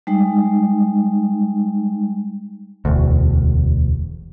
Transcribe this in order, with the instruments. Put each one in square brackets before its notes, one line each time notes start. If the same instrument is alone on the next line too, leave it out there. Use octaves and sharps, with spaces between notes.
[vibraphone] G3 G#3 D#4
[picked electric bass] E1 D2